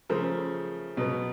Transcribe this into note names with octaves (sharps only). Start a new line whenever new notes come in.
C#3 F3 A3 A#4 C5
B2 F#3 B3